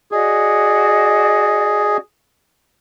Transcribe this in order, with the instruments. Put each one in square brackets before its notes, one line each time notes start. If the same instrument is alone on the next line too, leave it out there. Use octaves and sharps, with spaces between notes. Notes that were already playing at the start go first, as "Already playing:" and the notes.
[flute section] F#4 D5 D#5 [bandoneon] G#4